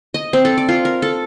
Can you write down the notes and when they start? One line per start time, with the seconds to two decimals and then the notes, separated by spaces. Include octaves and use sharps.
0.14 D#5
0.33 C4
0.45 A4
0.58 D5
0.69 F4
0.85 A#4
1.02 A4